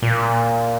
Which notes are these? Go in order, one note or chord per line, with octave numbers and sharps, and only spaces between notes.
A#2